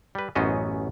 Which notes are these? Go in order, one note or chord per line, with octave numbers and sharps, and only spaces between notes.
G3 B4
A1 F#2 B3 C#4 C5 D#5